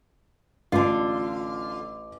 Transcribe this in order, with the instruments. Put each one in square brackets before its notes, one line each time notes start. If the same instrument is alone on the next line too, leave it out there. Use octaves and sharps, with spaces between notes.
[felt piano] A1 D6 [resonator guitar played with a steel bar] D3 F4